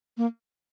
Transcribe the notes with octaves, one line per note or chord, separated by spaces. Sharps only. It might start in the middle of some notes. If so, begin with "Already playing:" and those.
A#3